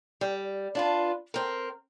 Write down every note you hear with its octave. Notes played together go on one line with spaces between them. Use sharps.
G3
D4 F4 B4
C4 A#4